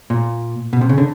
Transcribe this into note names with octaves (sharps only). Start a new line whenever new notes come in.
A#2
B2
C3
C#3
D3